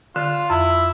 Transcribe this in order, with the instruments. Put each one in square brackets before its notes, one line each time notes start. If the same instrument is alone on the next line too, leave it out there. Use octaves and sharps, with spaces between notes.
[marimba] D3 [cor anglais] F4
[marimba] F2 [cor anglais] E4